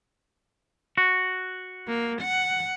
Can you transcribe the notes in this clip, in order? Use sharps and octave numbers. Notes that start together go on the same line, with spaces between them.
F#4
A#3
F#5